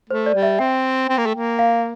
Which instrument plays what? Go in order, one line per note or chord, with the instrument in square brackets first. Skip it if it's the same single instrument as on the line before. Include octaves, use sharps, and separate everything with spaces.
[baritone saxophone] A3 [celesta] C5
[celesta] D5
[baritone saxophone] G3
[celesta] E5
[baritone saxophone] C4 [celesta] G5
[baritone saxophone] C4
A#3
A3
A#3
[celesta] F5